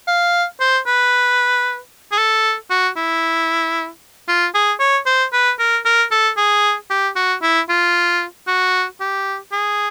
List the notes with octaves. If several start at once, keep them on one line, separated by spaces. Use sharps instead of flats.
F5
C5
B4
G#4
A4
F#4
E4
F4
G#4
C#5
C5
B4
A#4
A#4
A4
G#4
G4
F#4
E4
F4
F#4
G4
G#4